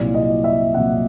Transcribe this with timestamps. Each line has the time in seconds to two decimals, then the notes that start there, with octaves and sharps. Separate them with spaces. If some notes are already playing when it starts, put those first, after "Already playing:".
Already playing: C2 A#2 F#3 D5
0.14 D#5
0.44 E5
0.74 C2 A#2 F#3 F#5